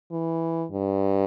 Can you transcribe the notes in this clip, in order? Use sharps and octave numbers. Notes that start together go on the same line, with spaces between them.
E3
G2